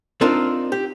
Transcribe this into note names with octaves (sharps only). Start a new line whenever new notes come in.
C4 D4 D#4 F4 A#4
G4